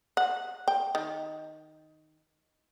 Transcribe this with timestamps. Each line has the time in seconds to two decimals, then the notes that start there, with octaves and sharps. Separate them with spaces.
0.17 F#5
0.68 G5
0.95 D#3